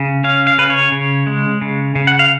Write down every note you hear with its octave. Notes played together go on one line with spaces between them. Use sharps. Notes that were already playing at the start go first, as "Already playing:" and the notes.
Already playing: C#3
C#4 F5
F5
C#3 B4
C#5
C#3
G#3
C#3
C#3
F#5
F5